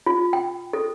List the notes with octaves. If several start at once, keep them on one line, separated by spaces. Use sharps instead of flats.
F4
G5
A4